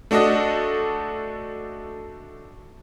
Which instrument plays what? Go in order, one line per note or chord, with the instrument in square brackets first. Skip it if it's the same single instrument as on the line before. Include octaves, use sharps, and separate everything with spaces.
[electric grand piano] A3 D4 F#4 A4 D#5